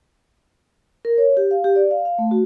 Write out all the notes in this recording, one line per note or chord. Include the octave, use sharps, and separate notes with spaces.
A#4
C#5
G4
F5
G4
D5
F5
F5
A3
F#4